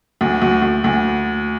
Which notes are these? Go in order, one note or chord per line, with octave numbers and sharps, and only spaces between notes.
D2
D2
D2
D2